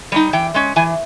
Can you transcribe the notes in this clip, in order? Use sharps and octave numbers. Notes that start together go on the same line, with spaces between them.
G3 C4 D#4
E3 G5
G#3 C#4
E3 G#5